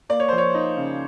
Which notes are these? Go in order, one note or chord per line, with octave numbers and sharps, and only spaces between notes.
A#3 D5
C#5
F3 C5
C#5
D#4
C#3